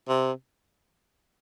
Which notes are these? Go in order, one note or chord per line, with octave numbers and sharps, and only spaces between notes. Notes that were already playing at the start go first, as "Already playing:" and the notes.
C3